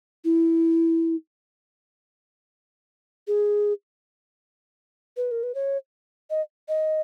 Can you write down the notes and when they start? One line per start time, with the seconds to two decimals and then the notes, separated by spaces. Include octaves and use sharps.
0.24 E4
3.27 G#4
5.17 B4
5.31 A#4
5.43 B4
5.55 C#5
6.30 D#5
6.68 D#5